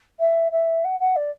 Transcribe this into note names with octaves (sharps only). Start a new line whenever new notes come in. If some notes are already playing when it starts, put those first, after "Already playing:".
E5
E5
F#5
F#5
D5